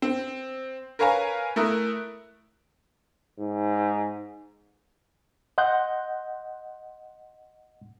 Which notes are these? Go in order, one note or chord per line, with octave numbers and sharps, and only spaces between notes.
C4
A#4 B4 C#5 F5 G#5 A#5
A3 E4 A#4 D#6 F#6
G#2
D#5 F#5 C6 F#6 G6